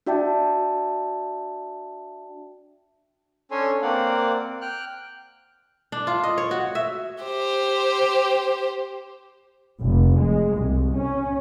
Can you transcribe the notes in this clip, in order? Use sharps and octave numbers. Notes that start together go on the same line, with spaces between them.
D4 F#4 D5 E5 G5 A5
C#4 D4 A4 C#5 G#5 C6
A#3 C4 D5 F5 F#5
G5 F6 F#6
D4
F4
D#5
C#5
F#4
E5
G4 C5
F1
G#3
C2
C#4